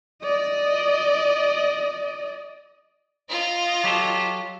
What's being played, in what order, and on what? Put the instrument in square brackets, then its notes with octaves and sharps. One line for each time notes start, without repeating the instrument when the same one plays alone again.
[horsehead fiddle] D5 D#5
[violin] F4 D#5
[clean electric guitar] F#3 G4 A4